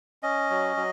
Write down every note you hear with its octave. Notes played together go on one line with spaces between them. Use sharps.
C#4 D#5
F#3
F#3